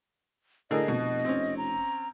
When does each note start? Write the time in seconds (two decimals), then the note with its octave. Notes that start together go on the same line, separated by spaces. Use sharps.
0.71 A2 D3 G#4 A#4 D#5
0.88 F1 B2
1.25 C4 C#4
1.57 A#5